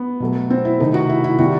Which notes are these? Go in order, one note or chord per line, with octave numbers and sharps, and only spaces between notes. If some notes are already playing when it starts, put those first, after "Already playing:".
Already playing: B3
B2 F#3 A3
C4
E4
C3 D#3 A3 D#4
F#4
E4
E4
C3 D#3 G3 F#4